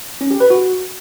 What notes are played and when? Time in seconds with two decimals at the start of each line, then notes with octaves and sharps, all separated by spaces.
0.21 C#4
0.31 G4
0.40 B4
0.50 F#4